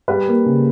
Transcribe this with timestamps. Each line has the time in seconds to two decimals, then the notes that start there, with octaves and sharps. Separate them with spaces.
0.08 G3 B4
0.27 A#3
0.46 C#3